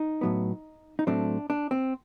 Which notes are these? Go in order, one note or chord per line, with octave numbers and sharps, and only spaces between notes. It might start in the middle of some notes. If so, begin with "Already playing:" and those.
Already playing: D#4
A2 F#3 B3
D#4
A2 F#3 A3 C4 D4
D4
C4